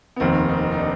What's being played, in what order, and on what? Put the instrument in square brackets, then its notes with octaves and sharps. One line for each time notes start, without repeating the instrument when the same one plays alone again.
[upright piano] B3
[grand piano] F1 D#2 D#3 [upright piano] C4
[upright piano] D#4
D#4
D4